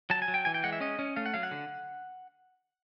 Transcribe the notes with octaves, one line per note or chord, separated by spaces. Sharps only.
F#3 A5
G#5
F#3
G5
E3 G#5
G5
G#3 F#5
E5
C#4 D#5
C#4
A3 F5
F#5
F#3 F5
F#5
D3